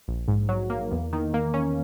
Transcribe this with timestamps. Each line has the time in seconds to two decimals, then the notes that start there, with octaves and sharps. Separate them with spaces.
0.08 A#1
0.28 G#2
0.49 F#3
0.70 A#3
0.91 E2
1.13 D#3
1.34 A#3
1.54 C#4